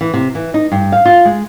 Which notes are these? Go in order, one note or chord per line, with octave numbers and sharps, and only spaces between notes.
E3
C3
E3
D#4
G2
F5
F4
G#3